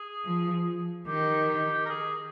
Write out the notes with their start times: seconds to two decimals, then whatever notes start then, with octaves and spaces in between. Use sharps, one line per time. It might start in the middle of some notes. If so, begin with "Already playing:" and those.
Already playing: G#4
0.25 F3
1.07 D#3 G4
1.86 A#4
1.90 G#4